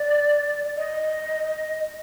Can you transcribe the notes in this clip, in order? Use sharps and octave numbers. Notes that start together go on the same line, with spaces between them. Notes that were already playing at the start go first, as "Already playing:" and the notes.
Already playing: D5
D#5